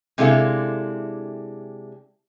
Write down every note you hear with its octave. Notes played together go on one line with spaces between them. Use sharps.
C3 G#3 D4 E4 A4 F5